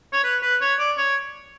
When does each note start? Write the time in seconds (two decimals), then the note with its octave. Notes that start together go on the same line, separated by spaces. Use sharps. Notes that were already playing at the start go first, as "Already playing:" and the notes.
0.13 C#5
0.24 B4
0.42 B4
0.61 C#5
0.79 D5
0.98 C#5